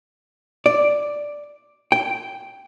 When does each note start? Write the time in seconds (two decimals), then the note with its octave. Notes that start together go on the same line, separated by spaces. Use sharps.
0.66 D5
1.92 G5